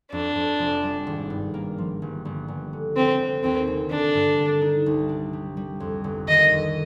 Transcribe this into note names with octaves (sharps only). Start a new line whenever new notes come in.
F2 D4
F2
F1
G3
G#1
G2
A#3
F3
G1
G1
G1
D3
F1 C4
D3
D#2 C4
F1
D3 D4
G2
D3
D#4
C2
D4
G3
G3
F2
G1
D#3 D#5
F2